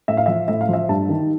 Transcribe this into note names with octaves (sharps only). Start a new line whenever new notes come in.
A2 E5
F5
F3 E5
A2 E5
F5
F3 E5
G2 A5
D#3